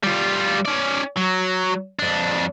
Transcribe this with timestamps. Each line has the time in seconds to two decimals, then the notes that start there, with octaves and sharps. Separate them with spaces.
0.04 G3 F4
0.66 C#4 D5
1.17 F#3
1.99 F2 D4